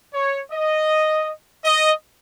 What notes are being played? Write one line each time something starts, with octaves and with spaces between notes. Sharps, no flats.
C#5
D#5
D#5